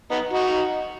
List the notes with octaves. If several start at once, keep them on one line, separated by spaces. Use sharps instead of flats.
B3 D#4
D#4 F#4